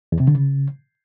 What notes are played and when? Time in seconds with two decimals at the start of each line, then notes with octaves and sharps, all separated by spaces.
0.12 E2
0.20 C3
0.28 D3
0.35 C#3